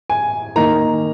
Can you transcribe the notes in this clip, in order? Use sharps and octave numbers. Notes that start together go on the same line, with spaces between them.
G#5
D#3 A#3 D#4 A#5